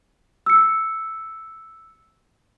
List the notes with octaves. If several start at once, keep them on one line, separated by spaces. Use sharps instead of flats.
E6 C#7